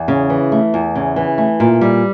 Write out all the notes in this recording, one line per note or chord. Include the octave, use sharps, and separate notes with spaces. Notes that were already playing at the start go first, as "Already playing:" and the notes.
Already playing: E2
C#3
E3
A3
E2
C#3
E3
A3
A#2
G3